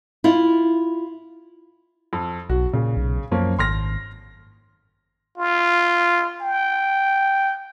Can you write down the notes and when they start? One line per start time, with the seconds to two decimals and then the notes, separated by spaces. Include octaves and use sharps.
0.24 E4 F4
2.13 F2
2.49 B1 F#4
2.73 A#2 C#3
2.97 B1
3.31 F#2 F3 A#3 C#4
3.59 G#1 C6 F6 A#6
5.38 F4
6.41 G5